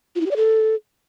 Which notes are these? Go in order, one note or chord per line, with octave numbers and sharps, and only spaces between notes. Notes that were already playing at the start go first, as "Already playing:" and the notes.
F4
E4
G4
D5
A4